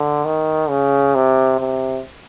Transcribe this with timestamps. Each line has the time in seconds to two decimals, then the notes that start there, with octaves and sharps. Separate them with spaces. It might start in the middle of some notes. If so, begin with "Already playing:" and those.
Already playing: D3
0.25 D#3
0.69 C#3
1.15 C3
1.60 C3